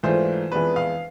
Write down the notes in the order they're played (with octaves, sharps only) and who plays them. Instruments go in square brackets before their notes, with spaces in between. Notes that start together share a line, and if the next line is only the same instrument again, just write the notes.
[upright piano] G#2 E3 A3 D4 F4 C5
F2 E3 G#3 B3 D4 B4
F5